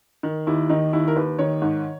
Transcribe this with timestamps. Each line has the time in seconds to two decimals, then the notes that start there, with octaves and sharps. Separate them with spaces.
0.23 D#3
0.47 D#2 E4
0.70 D#3 D#4
0.93 D#2 E4
1.08 A#4
1.16 D#2 B4
1.39 D#3 C#5
1.62 G#2